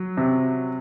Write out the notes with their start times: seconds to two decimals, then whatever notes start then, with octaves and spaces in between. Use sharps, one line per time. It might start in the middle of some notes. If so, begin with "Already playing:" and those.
Already playing: F#3
0.17 C3